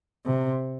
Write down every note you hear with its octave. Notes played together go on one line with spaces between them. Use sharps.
C3